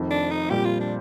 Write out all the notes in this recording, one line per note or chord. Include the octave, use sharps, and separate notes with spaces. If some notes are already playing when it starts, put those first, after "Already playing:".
Already playing: F1 F2 D#3
D4
D#4
A#2 G3 C4 G4
F4
D4